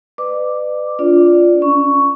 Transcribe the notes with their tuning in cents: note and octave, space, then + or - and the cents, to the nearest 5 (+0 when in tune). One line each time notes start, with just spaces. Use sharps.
B4 +25 D5 +40 D6 +0
D4 -35 F4 +0 D5 +0
C#4 +0 C#6 +10